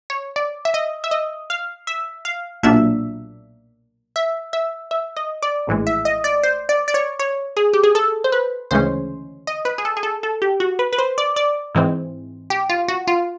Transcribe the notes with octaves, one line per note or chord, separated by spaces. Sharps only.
C#5
D5
E5
D#5
E5
D#5
F5
E5
F5
B1 A#2 F#3 A#3 D4 E5
E5
E5
E5
D#5
D5
A#1 A2 E3 G#3
E5
D#5
D5
C5
D5
D5
C#5
C#5
G#4
G4
G#4
A4
C5
B4
D2 C#3 E3 G#3 C#4 C5
D#5
B4
G#4
A4
G#4
A4
A4
G4
F#4
B4
B4
C5
D5
D5
G#2 E3 G#3 C4
G4
F4
F#4
F4